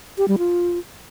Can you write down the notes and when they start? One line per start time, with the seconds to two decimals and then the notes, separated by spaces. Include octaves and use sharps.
0.18 G4
0.28 G3
0.38 F4